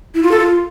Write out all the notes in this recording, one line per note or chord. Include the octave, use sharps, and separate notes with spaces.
E4
F4
A4
F4